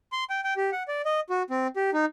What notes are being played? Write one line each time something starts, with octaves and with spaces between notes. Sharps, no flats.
C6
G5
G5
G4
F#5
D5
D#5
F#4
C4
G4
D#4